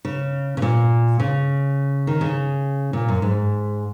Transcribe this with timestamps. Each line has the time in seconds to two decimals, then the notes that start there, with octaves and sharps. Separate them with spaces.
0.05 C#3
0.57 C#3
0.62 A#2
1.20 C#3
2.07 D#3
2.21 C#3
2.93 A#2
3.09 F#2
3.22 G#2